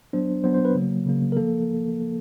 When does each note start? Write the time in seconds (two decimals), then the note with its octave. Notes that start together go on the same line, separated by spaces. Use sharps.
0.13 F#3 B3 D4 C5
0.44 F#3 B3 D4 C5
0.54 C5
0.65 B4
0.75 C#3 F#3 A#3
1.06 C#3 F#3 A#3
1.32 A#4
1.37 F3 A#3 A4